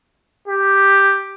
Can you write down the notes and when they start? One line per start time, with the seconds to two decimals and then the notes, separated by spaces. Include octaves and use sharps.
0.48 G4